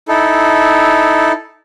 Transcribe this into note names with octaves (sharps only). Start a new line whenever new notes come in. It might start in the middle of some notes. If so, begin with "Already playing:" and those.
D#4 E4 A4